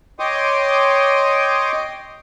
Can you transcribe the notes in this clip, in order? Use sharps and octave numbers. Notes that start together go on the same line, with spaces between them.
C#5 D#5 G5 C6 D6 D#6